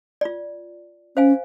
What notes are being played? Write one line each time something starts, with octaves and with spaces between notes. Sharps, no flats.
F4 D5
C#4 C5 F5 G#5